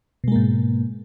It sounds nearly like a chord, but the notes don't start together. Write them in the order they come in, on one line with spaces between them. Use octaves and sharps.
B2 G#3 A#3 G#2